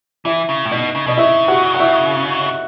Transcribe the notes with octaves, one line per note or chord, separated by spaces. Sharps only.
E3 E4 E5
C#3
A2
B2 D#4 D#5
C#3
B2 D#5
C#3 E4 E5
F#4 F#5
F#5
E4 E5